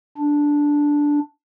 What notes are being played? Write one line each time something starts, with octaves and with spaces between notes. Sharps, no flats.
D4